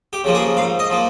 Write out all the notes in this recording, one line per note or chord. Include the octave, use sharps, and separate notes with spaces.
G4
C#3 F3 A#3
G#4
G#2 F5
D#5
F3 A#3